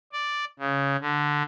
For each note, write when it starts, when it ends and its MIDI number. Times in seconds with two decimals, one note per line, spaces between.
0.13 0.45 74
0.59 0.96 49
1.01 1.42 50